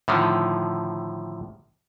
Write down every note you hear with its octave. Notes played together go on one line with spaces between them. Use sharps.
A2 D3 D#3 F3